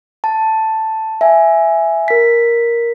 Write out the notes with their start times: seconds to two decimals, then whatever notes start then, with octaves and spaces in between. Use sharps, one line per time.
0.24 A5
1.21 E5 G#5
2.08 A#4 B6